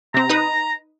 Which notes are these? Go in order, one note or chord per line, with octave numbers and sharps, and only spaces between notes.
C3 C4 A#5
D#4 B4 D#6